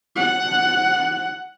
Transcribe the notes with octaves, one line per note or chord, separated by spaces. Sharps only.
F#5